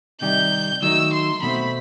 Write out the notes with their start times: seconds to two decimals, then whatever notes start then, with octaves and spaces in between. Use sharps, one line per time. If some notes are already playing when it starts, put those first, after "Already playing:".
0.21 C3 D#3 G3 D#4 G4 G6
0.82 D#3 F#3 A3 D#4 E6
1.13 C6
1.42 B2 A3 C4 B5